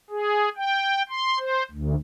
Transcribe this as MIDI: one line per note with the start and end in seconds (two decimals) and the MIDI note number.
0.10 0.49 68
0.56 1.02 79
1.09 1.38 84
1.39 1.63 72
1.71 1.95 38